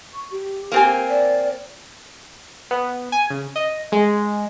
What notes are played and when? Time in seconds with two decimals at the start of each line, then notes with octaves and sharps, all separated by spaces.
0.13 C#6
0.31 G4
0.72 A#3 C4 G#5
1.10 D5
2.71 B3
3.12 G#5
3.30 C#3
3.56 D#5
3.92 G#3